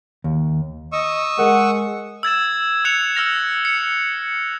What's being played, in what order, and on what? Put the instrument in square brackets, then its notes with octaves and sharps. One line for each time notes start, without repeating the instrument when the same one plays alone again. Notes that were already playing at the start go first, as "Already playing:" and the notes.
[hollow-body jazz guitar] D#2
[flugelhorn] D#5 [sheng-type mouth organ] C#6 D#6 E6
[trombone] G#3 [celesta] A#4 [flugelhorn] F#5
[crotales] E6 G#6 A6 E7
E6 F#6 C#7 F7
E6 F6 A#6 F7
C#7